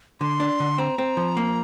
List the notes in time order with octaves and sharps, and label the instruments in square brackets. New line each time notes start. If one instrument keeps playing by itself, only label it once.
[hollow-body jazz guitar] D3 [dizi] C6
[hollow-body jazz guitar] D4
D3
[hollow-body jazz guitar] C4 [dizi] A#5
[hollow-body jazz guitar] C4
F3
A#3